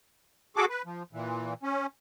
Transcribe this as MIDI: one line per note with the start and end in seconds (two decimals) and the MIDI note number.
0.56 0.65 66
0.56 0.65 68
0.56 0.65 69
0.56 0.65 86
0.69 0.82 71
0.85 1.03 53
1.13 1.54 46
1.13 1.54 52
1.63 1.86 61